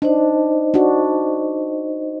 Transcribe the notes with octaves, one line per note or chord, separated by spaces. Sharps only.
D4 D#4 C5 D#5
D4 F#4